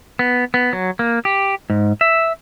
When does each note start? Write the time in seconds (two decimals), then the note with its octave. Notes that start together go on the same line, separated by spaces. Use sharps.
0.19 B3
0.54 B3
0.73 F#3
0.99 A#3
1.25 G4
1.70 G#2
2.01 E5